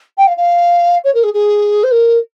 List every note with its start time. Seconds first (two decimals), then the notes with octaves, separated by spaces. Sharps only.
0.18 G5
0.27 F5
0.37 F5
1.04 C#5
1.14 A#4
1.23 G#4
1.34 G#4
1.83 C5
1.91 A#4